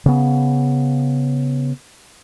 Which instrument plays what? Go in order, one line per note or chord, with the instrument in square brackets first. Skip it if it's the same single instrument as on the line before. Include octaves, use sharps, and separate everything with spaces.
[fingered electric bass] C#3 B3